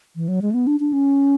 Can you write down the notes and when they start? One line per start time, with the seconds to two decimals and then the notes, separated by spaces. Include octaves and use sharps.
0.16 E3
0.28 F#3
0.42 G#3
0.51 A3
0.54 B3
0.67 D4
0.80 D4
0.93 C#4